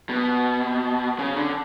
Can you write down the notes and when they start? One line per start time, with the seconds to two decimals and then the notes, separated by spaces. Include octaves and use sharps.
0.09 B2
1.19 C#3
1.36 D3